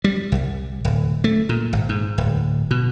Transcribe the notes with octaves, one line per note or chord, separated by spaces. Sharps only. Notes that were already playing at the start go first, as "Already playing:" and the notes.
G3
C2
D1
A3
A#2
G#1
G#2
D1
B2